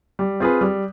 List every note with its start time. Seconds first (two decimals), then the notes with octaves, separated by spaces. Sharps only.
0.19 G3
0.40 C4 F4 G#4 B4
0.61 G3